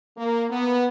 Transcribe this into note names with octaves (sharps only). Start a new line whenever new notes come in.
A#3
B3